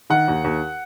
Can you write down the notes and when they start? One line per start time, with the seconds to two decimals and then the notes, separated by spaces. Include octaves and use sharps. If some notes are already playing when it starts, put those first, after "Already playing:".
0.10 D#3 F#5
0.28 D#2
0.44 D#2